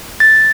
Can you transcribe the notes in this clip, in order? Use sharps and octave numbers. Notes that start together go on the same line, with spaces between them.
A6